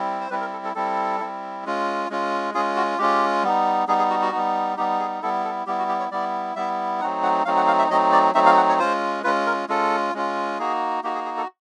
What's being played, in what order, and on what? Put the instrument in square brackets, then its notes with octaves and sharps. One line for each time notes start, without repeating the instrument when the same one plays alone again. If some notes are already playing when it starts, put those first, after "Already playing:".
Already playing: [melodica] G3 C4 E4
C5
G3 C4 E4 B4
A#4
A4
A4
G3 C4 E4 A4
G3 C4 E4
G#3 C#4 F4
G#3 C#4 F4
G#3 C#4 F4 G#4
F#4
G#3 C#4 F4 G4
G3 B3 D#4
G3 B3 D#4 G#4
G#4
F#4
F#4
G3 B3 D#4
G3 B3 D#4 G4
G#4
G3 B3 E4 A4
A4
G3 B3 E4 G4
F#4
G4
C#5
G3 B3 E4 D5
G3 B3 E4 E5
F#3 A3 C4 D#4 F#5
F#5
F#3 A3 C4 D#4 F5
F#5
F5
E5
F#3 A3 C4 D#4 D#5
D5
F#3 A3 C4 D#4 E5
F5
F#5
C#5
G#3 C#4 F4 C5
G#3 C#4 F4 B4
A#4
G#3 C#4 F4 A4
G#3 C#4 F4
A#3 D#4 F#4 G#4
A#3 D#4 F#4 G4
G#4
G#4
A4